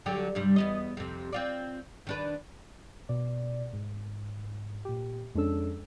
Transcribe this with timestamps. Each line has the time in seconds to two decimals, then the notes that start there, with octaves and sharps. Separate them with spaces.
0.06 D3 F#3 G4
0.35 G2 C3 G3
0.56 E2 B3 D#5
0.97 F2 C3
1.33 C4 F4 D5
2.07 D#3 D4 B4
3.09 B2 D5
3.73 G#2
4.85 A#2 G4
5.35 F2 G#3 C#4 D4 A4 E6